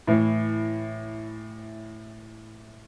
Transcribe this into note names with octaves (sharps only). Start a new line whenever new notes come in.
A2 E3